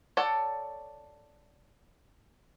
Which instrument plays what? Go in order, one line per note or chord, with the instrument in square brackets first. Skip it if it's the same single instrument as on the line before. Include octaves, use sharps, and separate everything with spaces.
[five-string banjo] A4 C#5 D5 F#5